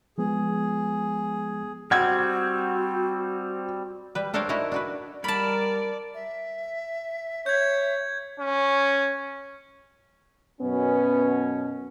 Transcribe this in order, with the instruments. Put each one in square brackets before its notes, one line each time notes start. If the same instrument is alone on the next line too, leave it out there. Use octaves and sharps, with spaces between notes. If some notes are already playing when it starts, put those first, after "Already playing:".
[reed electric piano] F3 G#3 B3 [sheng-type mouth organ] G#4
[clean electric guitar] G3 C4 [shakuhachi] F#4 [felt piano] F#5 G#6
[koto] G3 B4
D4 A4 A#4 C5 C#5 F5
D#4 E4 F#4 A4 A#4
D4 F#4 B4
[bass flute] G3 [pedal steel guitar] A#4 [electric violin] D5 [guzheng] A5 B5
[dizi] E5
[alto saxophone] C#5 [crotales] G6 G#6
[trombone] C#4
[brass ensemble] F#2 B2 C#4 [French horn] B3